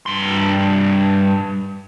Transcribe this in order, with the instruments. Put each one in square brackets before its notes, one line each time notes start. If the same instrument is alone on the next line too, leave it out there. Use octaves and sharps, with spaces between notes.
[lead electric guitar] G2 C6